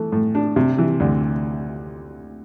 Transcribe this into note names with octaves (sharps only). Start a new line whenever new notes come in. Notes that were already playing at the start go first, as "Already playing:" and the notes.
Already playing: E3 A3
A2
D4
C3
E3
D2